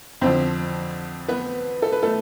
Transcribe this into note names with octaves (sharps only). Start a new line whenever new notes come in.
F2 D3 F3 C4 C5
B3 B4
A4
B4
A3 A4